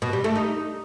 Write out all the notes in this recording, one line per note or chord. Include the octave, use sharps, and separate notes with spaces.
B2
G3
A3
D#4